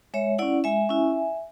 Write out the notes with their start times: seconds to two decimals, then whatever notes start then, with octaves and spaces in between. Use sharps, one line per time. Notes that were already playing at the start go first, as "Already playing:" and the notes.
0.14 G#3 C#5 E5
0.38 C#4 E4 D5 F#5
0.64 G#3 E5 G#5
0.89 C#4 E4